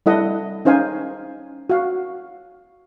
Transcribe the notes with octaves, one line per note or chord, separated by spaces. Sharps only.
G3 E4 A4 D#5 F#5
C#4 D#4 C5 F5 G#5
F#4 F5